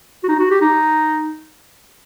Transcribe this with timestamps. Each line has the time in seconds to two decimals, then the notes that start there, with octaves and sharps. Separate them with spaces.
0.23 F#4
0.28 D#4
0.39 F#4
0.51 G4
0.61 D#4